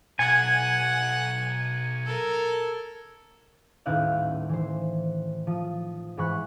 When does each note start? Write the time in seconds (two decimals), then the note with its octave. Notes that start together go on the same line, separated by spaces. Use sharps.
0.19 B1 F#5 G#5 G#6 C#7
2.06 A4 A#4
3.86 D#1 A1 D#4 E4 F5 F#6
4.49 E3 C5
5.47 F3 D#6
6.17 G#2 E3 B5 C#6 F#6